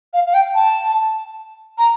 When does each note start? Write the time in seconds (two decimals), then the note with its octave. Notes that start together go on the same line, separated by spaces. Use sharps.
0.13 F5
0.27 F5
0.34 G5
0.55 A5
1.78 A#5